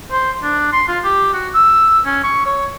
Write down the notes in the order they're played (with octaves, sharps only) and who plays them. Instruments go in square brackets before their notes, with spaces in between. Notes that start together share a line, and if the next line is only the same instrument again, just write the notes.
[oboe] C5
D4
C6
F4
G4
F#4
E6
C#4
C#6
C#5